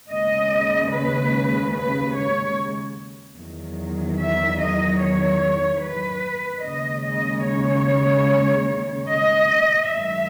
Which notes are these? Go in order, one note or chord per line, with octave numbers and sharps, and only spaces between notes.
D#2 C#3 G#3 D#5
B4
B4
C#5
E2 D#3 F#3
E5
D#5
C#5
B4
D#2 C#3 G#3 D#5
D#5
C#5
D#5
F#2 D#3 G#3 E5